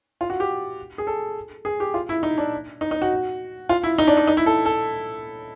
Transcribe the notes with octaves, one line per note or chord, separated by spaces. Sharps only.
F4
F#4
G4
G#4
A4
G#4
G4
F4
E4
D#4
D4
D#4
D#4
F#4
F4
E4
D#4
D4
D#4
D#4
E4
A4
A4